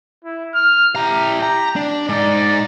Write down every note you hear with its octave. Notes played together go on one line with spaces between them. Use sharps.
E4
F6
E4 G4 A#5
A#5
D4
G#2 D#4 D5